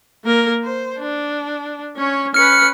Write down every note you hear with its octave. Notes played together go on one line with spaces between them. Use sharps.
A#3 A#4
C5
D4
C#4 C#5
C#4 B4 F6 C#7